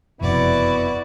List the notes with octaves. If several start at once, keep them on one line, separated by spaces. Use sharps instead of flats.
F#1 F2 C3 B3 E4 F#4 D5